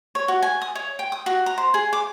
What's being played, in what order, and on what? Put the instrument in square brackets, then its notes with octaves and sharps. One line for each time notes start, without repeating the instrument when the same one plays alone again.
[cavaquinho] C#5
F#4
G#5
D#6
C#5
G5
D#6
F#4
A#5
C5
G#4
D6